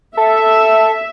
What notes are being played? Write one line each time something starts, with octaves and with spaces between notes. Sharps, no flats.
A4 E5